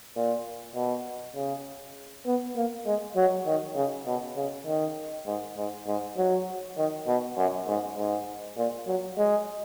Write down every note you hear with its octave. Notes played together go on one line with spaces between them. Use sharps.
A#2
B2
C#3
B3
A#3
G#3
F#3
D#3
C#3
B2
C#3
D#3
G#2
G#2
G#2
F#3
D#3
B2
F#2
G#2
G#2
A#2
F#3
G#3